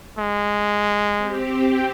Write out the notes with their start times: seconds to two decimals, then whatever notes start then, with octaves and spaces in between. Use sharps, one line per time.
0.18 G#3
1.17 C4 G4